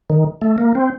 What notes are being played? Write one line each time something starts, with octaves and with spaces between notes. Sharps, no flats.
D#3
A3
A#3
C4